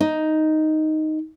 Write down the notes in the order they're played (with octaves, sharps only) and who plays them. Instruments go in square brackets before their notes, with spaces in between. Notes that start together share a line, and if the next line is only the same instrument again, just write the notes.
[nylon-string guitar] D#4